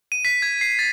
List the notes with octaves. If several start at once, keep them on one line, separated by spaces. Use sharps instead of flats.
D#7
B6
G#6
C7
A6